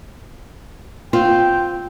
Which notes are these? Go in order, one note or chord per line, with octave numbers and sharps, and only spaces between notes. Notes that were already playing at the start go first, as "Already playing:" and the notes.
C4 F4 G5